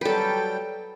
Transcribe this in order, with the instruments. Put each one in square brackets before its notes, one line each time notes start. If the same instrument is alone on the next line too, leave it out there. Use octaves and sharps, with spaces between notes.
[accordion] F#3 G3 G5 [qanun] A4 B4